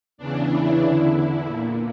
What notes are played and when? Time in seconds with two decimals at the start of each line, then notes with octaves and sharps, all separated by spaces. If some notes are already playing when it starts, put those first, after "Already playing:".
0.18 E2 C#3 E3 D4
0.50 E4
0.82 E2 D3
1.46 A#2